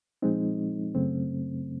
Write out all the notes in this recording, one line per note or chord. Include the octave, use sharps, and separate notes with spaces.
A#2 F3 G#3 C4 D#4
F#2 C#3 F#3 A3 C4